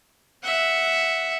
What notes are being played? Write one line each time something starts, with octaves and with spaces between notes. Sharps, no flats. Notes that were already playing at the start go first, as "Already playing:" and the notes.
E5 F#5